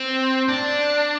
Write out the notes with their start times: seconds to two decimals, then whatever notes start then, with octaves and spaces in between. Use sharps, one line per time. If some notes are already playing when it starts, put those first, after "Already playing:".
Already playing: C4
0.49 D4